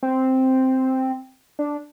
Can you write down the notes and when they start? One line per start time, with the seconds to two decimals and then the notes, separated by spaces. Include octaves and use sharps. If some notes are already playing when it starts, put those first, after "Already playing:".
0.03 C4
1.59 D4